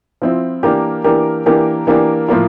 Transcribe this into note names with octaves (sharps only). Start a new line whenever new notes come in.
F3 C4 E4
E3 A#3 D4 G4 A#4
E3 A#3 D4 G4 A#4
E3 A#3 D4 G4 A#4
E3 A#3 D4 G4 A#4
A2 F3 A#3 F4